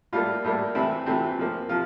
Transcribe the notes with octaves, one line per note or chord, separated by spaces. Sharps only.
A2 G3 A#3 F4
A2 G3 A#3
C3 E3 A3 C4 E4
C3 E3 A3 C4
C3 F3 A#3
C3 F3 F4